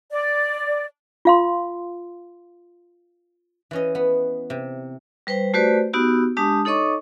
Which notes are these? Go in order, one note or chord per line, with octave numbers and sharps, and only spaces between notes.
D5
F4 F5 C6
E3 C#4 D#5
B3
C3
G3 B4 C5 G5
A3 F#4 G4 B4 C5 D5
B3 D#4 F#4 G4 E6
G#3 D4 G4 A5 D#6
D#4 A4 C#5 D#5 C#6 D6